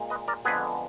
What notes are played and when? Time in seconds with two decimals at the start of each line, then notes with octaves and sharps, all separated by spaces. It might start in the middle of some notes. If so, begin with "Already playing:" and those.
Already playing: A#2 G#3
0.10 B4 D#5
0.28 A#4 D5
0.45 F2 D3 G#3 B3 G#4 B4